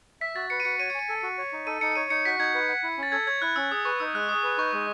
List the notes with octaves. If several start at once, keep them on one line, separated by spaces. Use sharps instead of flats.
E5 B6
F#4 A6
B4 C#7
D#7
F#4 C#7
C#5 D#7
C#7
G#5 D#7
A4
F#4
C#5
D#4
A4 D#7
D#4 C#7
C#5 D#7
D#4 C#7
F#4 B6
D#4 G#6
B4
F#5
E4
C#4
A6
A4 G#6
C#5 G#6
E4 F#6
C#4 E6
G#4 D#6
B4 C#6
D#4 E6
G#3 F#6
G#4 D#6
B4
D#4 C#6
G#3